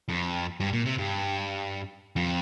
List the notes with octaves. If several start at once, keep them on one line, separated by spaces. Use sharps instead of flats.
F2
G2
A#2
C3
G2
F2